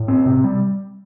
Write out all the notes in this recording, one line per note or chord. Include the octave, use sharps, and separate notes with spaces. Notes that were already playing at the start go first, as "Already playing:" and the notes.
Already playing: A2
C4
C3
G3